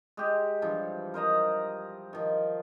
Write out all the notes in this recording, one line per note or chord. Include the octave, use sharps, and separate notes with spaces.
G#3 G4
G2 E3 F3
A#4 C5 D#5 A#5
D#3 F3